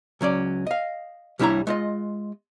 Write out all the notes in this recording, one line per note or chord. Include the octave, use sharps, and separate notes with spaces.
C#2 F#3 C#4 D5
D#5 F5
C2 G3 D4 E4 C#5 A#5
G#3 F4 D#5